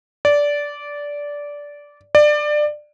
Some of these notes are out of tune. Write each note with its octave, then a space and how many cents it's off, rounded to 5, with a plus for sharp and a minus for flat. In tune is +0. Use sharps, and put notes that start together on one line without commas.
D5 -15
D5 +20